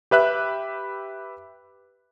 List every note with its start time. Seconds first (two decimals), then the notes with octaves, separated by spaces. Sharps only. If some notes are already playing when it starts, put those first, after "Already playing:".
0.11 G4 B4 E5 F#6